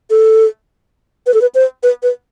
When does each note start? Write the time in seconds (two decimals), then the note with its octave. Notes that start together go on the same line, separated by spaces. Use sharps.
0.10 A4
1.26 B4
1.34 A4
1.41 B4
1.55 C5
1.83 B4
2.03 B4